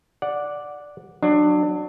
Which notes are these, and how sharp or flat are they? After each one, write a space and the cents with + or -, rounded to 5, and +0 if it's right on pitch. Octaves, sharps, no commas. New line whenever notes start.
D5 +0 F#5 -10
F#3 +0 D4 +25